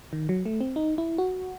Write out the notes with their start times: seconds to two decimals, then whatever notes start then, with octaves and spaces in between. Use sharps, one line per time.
0.13 D#3
0.29 F#3
0.45 A3
0.61 C4
0.76 D#4
0.98 E4
1.18 F#4